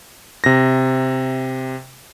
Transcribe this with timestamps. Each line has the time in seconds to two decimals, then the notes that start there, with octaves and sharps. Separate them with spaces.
0.44 C3 A#6